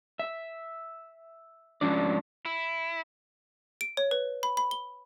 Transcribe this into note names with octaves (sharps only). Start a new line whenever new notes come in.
E5
G#2 F3 C#4 D4 D5
E4
D7
C#5
B4
B5
B5
G7